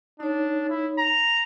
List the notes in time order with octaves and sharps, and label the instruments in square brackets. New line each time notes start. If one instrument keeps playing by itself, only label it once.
[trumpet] D4 [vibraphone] D#4 C#5
[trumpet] E4
A#5